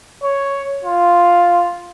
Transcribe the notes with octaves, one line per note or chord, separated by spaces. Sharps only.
C#5
F4